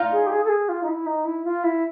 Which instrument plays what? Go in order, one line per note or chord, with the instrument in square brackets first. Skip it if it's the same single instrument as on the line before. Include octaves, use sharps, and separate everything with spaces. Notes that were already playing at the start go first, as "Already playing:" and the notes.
Already playing: [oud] D#4 F4
[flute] G#4
G4
G#4
A4
G#4
F4
D#4
E4
D#4
E4
F4
E4